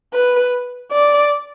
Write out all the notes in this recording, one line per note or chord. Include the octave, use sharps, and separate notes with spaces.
B4
D5